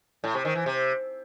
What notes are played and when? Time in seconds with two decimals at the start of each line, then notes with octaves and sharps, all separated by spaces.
0.24 A2
0.34 C3
0.45 D#3
0.56 E3
0.66 C3